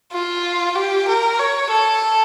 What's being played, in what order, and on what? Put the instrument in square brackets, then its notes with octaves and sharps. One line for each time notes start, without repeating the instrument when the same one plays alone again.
[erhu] F4
G4
A#4
C#5
A4